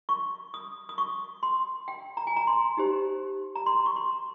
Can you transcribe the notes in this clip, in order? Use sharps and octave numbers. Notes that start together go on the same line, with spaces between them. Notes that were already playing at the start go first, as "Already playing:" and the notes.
C#6
D#6
D#6
C#6
C6
G5
A#5
G#5
A#5
C6
D#4 G4 C5
A#5
C6
C#6
C6